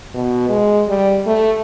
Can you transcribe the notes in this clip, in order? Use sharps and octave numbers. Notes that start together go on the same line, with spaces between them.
B2
G#3
G3
A3